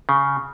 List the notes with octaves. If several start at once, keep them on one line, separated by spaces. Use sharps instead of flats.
C#3